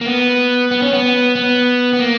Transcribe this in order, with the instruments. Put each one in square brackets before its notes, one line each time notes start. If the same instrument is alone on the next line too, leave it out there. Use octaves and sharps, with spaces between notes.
[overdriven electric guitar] A#3
B3
B3
C#4
B3
B3
B3
A#3